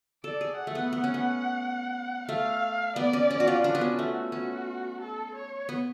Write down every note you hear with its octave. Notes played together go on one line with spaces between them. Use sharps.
A4 D5
G#4
F#5
A3
B3
B3
C#4
B3
A3 F5
B3 D5
C#4
C#4
F#4
F4
D4 F#4
B3
C#4
A3
C#4 F#4
A4
C#5
B3